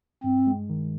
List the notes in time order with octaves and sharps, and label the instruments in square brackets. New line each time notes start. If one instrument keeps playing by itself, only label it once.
[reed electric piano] G2 [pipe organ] C4
[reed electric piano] G#3
D#3